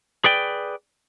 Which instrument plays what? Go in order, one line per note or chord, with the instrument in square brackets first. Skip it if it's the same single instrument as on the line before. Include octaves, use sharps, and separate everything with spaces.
[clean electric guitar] G#4 B4 D5 G5